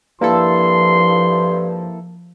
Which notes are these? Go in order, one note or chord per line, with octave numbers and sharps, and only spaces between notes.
G2 F3 A#3 E4 A4 C6